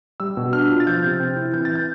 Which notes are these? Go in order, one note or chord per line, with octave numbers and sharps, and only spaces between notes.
G3 E6
B2
D4 F6
F4
A6
F3 G6
C3
C4
E4
E3 G6
A6
G6